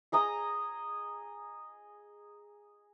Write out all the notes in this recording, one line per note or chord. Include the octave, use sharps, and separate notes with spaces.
G#4 D#5 A#5 D#6